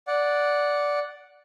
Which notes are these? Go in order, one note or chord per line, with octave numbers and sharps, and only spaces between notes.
D5 F#5